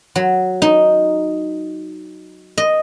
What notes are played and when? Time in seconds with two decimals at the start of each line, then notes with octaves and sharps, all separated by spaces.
0.16 F#3
0.62 D#4
2.58 D#5